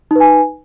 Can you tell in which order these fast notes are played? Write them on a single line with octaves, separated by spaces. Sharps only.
D#4 B4 G#5